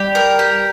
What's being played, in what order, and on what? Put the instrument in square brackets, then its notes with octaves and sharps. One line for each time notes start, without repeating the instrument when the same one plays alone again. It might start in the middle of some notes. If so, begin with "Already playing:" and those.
Already playing: [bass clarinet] G3 [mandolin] G4
[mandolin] A#4
G4